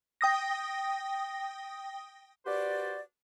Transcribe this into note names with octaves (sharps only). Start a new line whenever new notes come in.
G5 D#6 A#6
F#4 G4 B4 C5 D5